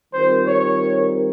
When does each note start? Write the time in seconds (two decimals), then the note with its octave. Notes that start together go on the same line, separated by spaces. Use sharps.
0.13 D#3 G3 C4 F4 A#4 C5
0.47 C#5